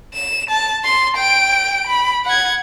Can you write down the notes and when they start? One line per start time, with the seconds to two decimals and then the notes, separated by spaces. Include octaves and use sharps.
0.14 E7
0.50 A5
0.84 C6
1.17 G5 D7
1.87 B5
2.25 F#5 G#6